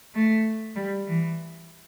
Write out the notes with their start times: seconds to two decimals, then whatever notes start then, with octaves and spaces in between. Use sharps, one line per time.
0.15 A3
0.76 G3
1.07 E3